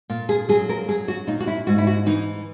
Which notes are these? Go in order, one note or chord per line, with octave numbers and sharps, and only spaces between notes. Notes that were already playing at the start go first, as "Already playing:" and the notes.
A#2
G#4
F#3 G#4
A#4
F#3 G#4
F#4
A#2 D#4
F#4
E4
G#2 F#4
E4
F#4
E3 D#4